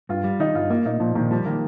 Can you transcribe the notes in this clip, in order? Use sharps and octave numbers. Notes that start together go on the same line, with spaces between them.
G2 F4
G3
D#3 D#4
G2 F4
A#3 F4
A#2 D#4
A#2 F3
A#2 D#3
F3 G3
D#3 A#3